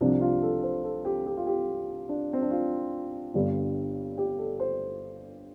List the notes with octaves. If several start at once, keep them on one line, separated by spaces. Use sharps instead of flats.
C2 C3 F3 D4
F4
A4
C5
A4
G4
G4
F4
G4
D4
C4
D4
F4
G1 G2 D3 G3
G4
A4
C5